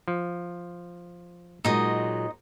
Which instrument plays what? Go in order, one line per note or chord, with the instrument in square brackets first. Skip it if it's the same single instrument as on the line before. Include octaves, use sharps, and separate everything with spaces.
[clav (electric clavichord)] F3
[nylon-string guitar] A#2 F#3 G#3 [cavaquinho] D#4 D#5